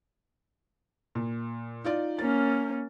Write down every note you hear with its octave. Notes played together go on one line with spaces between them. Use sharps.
A#2
D#4 F4 D5
A#3 C#4 A6